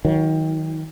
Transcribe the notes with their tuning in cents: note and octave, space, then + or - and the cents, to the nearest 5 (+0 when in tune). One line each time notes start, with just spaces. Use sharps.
D#3 +30 F#3 +0